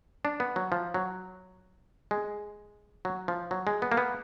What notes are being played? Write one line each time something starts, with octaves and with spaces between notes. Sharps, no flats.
D4
B3
F#3
F3
F#3
G#3
F#3
F3
F#3
G#3
B3
A#3
B3